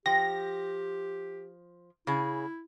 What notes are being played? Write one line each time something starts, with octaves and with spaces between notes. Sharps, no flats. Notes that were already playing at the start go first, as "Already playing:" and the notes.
F3 G4 G5 A#6
C#3 E4 G#4